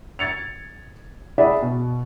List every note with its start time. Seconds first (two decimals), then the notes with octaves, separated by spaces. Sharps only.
0.19 G#6 A6 C#7 F7
1.38 G#4 D5 E5 F#5 B5
1.62 B2